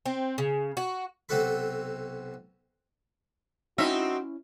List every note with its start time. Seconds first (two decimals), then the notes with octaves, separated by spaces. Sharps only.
0.06 C4
0.38 C#3
0.77 F#4
1.29 B1 C3 C4 F#4 A4 B5
3.78 C4 C#4 D#4 E4 F#4 E5